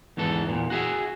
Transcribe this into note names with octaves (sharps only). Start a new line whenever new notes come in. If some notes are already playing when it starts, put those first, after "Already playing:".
E2 G#2 E3 A4
E2 A#2
F#4 G#4 E5